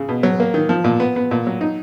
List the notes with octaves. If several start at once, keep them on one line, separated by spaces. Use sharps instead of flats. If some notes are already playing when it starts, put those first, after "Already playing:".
Already playing: C#3
B2
F#3
A#3
D#3
F3
A#2
B3
B3
A#2
F#3
D#4